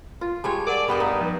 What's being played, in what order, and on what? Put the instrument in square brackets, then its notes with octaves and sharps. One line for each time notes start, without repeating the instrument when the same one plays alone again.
[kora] F4
[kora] G3 G#3 C#5 [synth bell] A5
[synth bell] A#4 F#5 [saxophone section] D5
[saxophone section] G2 [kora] G3 B3 D#5
[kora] D#4
[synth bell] F3